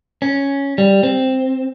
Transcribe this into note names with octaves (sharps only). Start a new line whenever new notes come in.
C#4
G3
C4